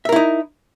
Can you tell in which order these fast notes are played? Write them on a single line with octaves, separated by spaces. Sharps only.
E5 A#4 E4 D#4